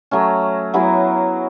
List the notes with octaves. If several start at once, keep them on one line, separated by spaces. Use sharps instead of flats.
F#3 A3 C#4
F#3 B3 E4 G#4